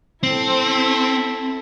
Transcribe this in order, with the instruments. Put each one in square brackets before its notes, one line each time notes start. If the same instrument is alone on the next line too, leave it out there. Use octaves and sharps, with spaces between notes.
[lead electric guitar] C4 [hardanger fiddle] E4 A4